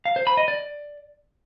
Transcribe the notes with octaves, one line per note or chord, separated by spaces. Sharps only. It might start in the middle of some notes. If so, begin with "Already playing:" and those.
F5
C5
B5
D#5
D5